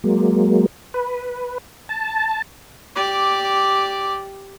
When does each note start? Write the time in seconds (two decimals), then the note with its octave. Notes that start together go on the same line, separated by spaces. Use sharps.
0.04 F#3 G#3 A#3
0.94 B4
1.89 A5
2.95 G4 D5